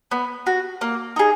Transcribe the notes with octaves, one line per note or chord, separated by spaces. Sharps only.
B3
F#4
A#3
D#4 G#4